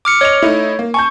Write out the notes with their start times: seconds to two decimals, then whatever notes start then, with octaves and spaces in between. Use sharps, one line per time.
0.05 D6 F6 C#7
0.21 C#5 D#5 F7
0.42 A3 D#4 E4
0.79 A#3
0.94 G#5 A5 C#6 G6